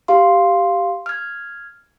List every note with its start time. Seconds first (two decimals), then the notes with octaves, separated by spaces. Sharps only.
0.08 G4 F5 C6
1.06 F6 G#6